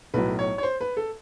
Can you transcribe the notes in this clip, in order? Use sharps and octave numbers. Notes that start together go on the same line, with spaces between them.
B1 A2 F#3 B4
C#5
C#5
C5
B4
A4